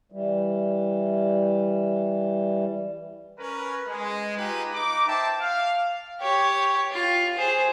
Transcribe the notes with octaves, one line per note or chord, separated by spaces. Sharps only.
E3 G3
C#4 A#4 B4
G#3
D#4 F4 G4 G#4 B4
D#4 D6
C5 E5 G5 A5
F5
G4 C#5
F4
G#4 C5